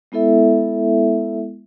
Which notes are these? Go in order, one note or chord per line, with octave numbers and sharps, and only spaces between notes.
G#3 B3 E4 A4 E5